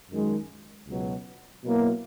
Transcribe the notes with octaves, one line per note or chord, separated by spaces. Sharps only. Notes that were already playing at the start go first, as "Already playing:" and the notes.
F#2 D#3 G#3
C#2 B2 F#3
B2 F#3 A#3 E4